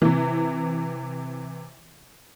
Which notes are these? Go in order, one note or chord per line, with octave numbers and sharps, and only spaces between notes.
C3 E3